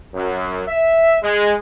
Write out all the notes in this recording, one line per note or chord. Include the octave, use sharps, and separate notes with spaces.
F#2
E5
G#3